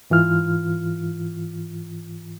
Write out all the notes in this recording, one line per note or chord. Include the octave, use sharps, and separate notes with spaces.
G#2 E3 F4 F6